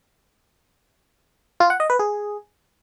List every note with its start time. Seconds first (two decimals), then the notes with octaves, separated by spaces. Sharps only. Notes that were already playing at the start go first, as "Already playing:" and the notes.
1.60 F4
1.70 F#5
1.80 D#5
1.90 B4
1.99 G#4